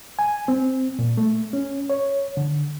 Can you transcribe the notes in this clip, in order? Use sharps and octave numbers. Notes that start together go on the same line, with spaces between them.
G#5
C4
A#2
A3
C#4
C#5
D3